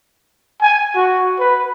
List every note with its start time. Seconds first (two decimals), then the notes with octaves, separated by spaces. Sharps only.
0.62 G#5
0.95 F#4
1.40 B4